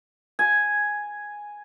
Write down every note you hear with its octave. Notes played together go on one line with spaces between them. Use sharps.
G#5